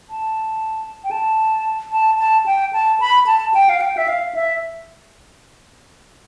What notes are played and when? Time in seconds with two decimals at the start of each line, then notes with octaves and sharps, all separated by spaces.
0.10 A5
1.04 G5
1.11 A5
1.92 A5
2.19 A5
2.46 G5
2.73 A5
3.00 B5
3.26 A5
3.54 G5
3.69 F5
3.81 G5
3.97 E5
4.08 F5
4.35 E5